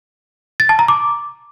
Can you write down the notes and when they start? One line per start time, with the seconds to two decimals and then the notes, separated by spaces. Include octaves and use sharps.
0.60 A6
0.69 A5
0.79 A#5
0.88 D6